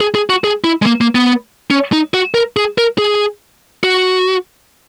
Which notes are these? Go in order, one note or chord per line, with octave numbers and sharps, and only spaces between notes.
G#4
G#4
F#4
G#4
E4
G#3
A#3
A#3
B3
C#4
D#4
F#4
A#4
G#4
A#4
G#4
F#4